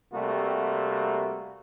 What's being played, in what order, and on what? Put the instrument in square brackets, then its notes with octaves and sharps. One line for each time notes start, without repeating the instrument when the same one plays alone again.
[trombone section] C3 G3 A3 A#3 F#4